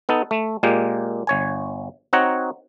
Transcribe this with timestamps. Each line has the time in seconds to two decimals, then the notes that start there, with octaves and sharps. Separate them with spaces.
0.09 B3 D#4 A4
0.31 A3
0.63 A#2 G#3 A#3 G4
1.27 G1 C#5 G#5
2.13 C4 D#4 F#4 C#5 F#5 A#5